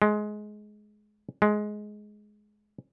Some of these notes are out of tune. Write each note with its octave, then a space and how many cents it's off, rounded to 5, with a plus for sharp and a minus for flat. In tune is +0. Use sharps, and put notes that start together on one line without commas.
G#3 +20
G#3 +15